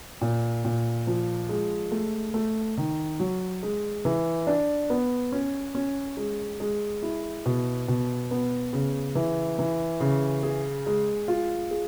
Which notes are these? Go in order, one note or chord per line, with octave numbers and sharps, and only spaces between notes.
A#2
A#2
F3
G#3
A3
A3
D#3
F#3
G#3
E3
D4
B3
C#4
C#4
G#3
G#3
E4
B2
B2
B3
C#3
E3
E3
C#3
G#4
G#3
F4
G#4